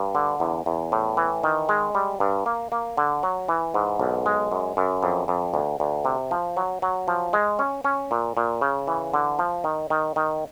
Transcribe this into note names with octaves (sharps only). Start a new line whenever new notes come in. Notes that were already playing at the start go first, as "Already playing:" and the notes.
Already playing: G2
D3
E2
E2
A2
E3
D#3
G#3
G3
G2
A#3
A#3
D3
F#3
E3
G#2
B1
G#3
F#2
F#2
F2
F2
D2
D2
C3
F3
F#3
F#3
F3
G#3
C#4
C#4
A#2
A#2
C#3
E3
D3
F3
D#3
D#3
D#3